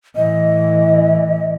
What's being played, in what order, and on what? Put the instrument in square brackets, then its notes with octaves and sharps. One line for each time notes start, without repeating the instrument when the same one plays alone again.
[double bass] A2 E3 [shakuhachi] D#5